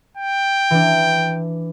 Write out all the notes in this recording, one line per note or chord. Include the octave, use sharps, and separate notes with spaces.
G5
E3 D4